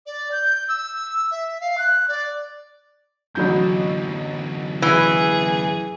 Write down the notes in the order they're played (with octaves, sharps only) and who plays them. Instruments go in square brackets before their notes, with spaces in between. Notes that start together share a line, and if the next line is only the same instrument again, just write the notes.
[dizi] D5
G6
E6
E5
F5
F#6
D5
[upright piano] A1 F#3 G6 [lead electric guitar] F#2 D3
[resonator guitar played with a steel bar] E3 [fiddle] G#4